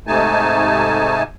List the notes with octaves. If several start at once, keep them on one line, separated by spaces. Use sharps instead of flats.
G#2 C3 A3 D#4 G#5 A5